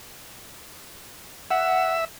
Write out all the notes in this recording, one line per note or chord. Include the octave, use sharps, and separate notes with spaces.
E5 F#5